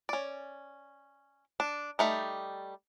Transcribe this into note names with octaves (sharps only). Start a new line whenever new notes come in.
C#4 D5
D4
G3 A3 D#4